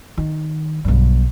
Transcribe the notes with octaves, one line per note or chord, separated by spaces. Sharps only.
D#3
B1 G2